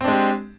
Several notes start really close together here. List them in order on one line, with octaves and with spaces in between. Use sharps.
C4 D4 G#3 G4